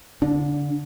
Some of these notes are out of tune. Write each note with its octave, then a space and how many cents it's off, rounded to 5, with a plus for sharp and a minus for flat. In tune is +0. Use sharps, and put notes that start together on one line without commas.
D3 -25 D4 +0